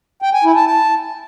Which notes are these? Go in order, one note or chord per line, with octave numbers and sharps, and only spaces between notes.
G5
G#5
E4
A5
A5